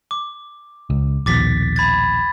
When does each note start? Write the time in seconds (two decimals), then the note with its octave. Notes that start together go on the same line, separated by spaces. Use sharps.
0.11 D6
0.90 C#2
1.26 A#1 D#2 B2 D6 A6 B6
1.76 B5 G#6 A6